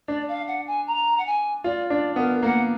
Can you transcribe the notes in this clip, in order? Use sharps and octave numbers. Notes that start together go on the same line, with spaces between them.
D4 D5
F5
F#5
G#5
A#5
F#5
G#5
F4 D5
D4 D5
B3 A#4
A#3 F#5